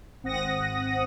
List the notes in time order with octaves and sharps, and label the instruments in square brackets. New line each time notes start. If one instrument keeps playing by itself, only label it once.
[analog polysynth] G#1 C4 F#5 D#6 A#6